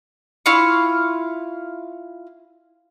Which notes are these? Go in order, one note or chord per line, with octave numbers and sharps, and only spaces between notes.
E4 F4 F5 C#6